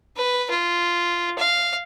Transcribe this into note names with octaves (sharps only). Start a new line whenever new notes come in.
B4
F4
F5